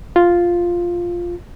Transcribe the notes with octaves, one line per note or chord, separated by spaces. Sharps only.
F4